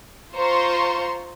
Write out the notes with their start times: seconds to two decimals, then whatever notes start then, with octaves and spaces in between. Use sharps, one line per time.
0.35 F4 C5 A#5 C6 C#6